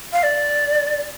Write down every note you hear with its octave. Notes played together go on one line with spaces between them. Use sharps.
F5
D5